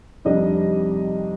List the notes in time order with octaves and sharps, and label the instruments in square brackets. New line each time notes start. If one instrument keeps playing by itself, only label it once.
[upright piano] F2 C3 G3 D4 D#4 D#5